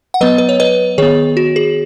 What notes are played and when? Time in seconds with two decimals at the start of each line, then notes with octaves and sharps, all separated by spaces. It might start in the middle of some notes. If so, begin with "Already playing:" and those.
0.14 F#5
0.21 F#3 B3 B4 D#5
0.38 B4
0.49 C#5
0.60 B4 D#5
0.98 D#3 B3 G#4 C#5
1.37 F#4
1.56 G#4